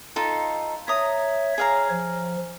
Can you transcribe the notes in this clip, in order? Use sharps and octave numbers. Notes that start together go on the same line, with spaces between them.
D#4 F4 A4
C#5 E5 A#5 D#6
G#4 C#5 F5 A#5
F3